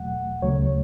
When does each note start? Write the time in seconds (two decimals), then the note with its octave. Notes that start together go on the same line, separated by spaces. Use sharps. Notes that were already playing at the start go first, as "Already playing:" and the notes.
Already playing: E2 B2 F#3 A3 F#5
0.42 D2 C#3 F#3 A3 C#5